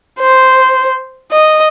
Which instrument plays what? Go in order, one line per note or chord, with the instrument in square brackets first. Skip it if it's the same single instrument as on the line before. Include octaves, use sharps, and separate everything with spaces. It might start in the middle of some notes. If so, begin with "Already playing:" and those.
[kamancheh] C5
D#5